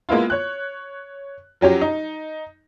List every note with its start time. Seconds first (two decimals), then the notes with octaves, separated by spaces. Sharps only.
0.09 G#3 A#3 B3 E4 F4
0.30 C#5 F#6
1.61 F3 F#3 C#4 G4
1.81 D#4